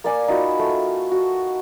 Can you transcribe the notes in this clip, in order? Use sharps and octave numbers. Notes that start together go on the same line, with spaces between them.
A#3 D5 G#5
D#4 F4 F#4 B5
A3
F#4